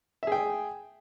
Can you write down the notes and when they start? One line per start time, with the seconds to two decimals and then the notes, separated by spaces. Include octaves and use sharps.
0.23 E5
0.27 G#4
0.32 G5